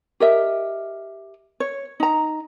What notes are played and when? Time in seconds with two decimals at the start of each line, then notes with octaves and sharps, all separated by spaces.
0.20 G4 A#4 D#5 E5
1.60 C#5
2.00 D#4 A#5